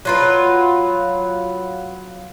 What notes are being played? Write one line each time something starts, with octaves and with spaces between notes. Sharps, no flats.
F#3 F4 B4